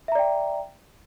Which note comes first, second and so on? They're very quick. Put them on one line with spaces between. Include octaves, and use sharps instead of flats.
E5 A#5 D5 G5